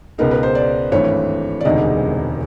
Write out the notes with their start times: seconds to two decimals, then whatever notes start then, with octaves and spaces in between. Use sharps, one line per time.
0.18 C#2 B2 G#3 B3 D#4 A#4
0.31 B4
0.43 C5
0.55 D5
0.92 G#1 G2 E3 A3 C#5
1.61 D5
1.65 E1 D2 C3 D#3 G#3 D#5